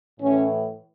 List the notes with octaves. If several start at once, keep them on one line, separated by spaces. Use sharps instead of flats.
A2 E3 C#4